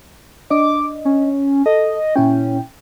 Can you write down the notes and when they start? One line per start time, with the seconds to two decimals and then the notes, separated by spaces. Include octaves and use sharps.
0.50 D4 D#5 D6
1.05 C#4
1.66 A4 D#5
2.16 A#2 C#4 E4 G5